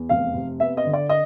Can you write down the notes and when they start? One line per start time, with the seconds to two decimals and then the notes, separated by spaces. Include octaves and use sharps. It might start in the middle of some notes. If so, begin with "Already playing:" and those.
Already playing: E2
0.09 F1 F5
0.35 C3
0.60 B3 E5
0.77 D#5
0.85 D3
0.93 D5
1.09 D#5